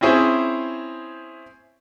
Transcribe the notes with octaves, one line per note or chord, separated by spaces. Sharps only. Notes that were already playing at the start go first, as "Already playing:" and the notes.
C4 C#4 E4 G#4 C5